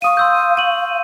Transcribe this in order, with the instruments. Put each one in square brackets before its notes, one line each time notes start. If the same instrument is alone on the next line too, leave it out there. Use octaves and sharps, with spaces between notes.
[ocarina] F5 [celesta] C#6 D#6 D#7
[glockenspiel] C6 E6 G6
[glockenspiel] C#6 [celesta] D#7 F#7